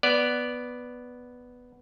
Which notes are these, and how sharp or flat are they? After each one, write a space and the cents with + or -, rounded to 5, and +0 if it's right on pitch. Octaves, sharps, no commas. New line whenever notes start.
B3 +0 D5 +0